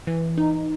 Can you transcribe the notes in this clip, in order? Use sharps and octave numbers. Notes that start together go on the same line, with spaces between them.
E3
D#4